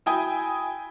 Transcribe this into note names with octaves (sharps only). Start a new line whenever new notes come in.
E4 F#4 G5 G#5 D#6